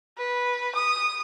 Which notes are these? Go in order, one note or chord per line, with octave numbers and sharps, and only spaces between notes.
B4
D#6